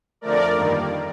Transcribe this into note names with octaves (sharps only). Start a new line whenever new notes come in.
F2 D3 F3 A3 A#4 D5
G2 D#3 G3 A#3